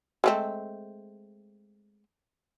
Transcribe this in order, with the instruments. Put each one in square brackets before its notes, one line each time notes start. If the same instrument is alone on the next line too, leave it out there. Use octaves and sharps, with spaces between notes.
[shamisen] G#3 A3 C4